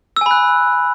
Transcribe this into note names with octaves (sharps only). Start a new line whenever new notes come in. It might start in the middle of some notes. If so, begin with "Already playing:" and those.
G#5 B5 E6 F#6